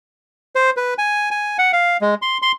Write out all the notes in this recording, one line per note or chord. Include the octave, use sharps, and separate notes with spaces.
C5
B4
G#5
G#5
F#5
F5
G#3
C6
C6